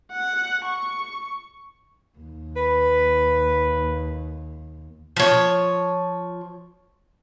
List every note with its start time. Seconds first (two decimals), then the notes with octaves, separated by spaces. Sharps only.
0.12 F#5
0.65 C#6
2.19 D#2
2.56 B4
5.16 F3 C#5